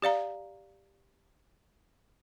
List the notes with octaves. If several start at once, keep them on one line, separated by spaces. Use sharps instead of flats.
G4 D5 F5 A#5